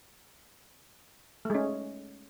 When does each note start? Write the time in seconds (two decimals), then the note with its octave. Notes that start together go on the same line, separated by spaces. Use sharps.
1.45 A3
1.50 G#3
1.55 C#4